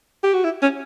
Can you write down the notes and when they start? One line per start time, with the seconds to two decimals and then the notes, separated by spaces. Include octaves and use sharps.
0.24 G4
0.34 F#4
0.44 E4
0.62 C#4